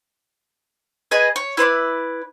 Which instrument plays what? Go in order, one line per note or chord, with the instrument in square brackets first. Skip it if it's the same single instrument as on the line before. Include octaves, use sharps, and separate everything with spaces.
[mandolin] G#4 B4 D#5 G#5
C#5
E4 B4 C5 D5